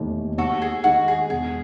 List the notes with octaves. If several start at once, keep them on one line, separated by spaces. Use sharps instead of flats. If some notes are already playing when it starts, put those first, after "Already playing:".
Already playing: E1 D#2 D#3 A3
D#2 F#4 A4
G#4
D#3 G#3 D#4 F#4
G#4
E1 G#4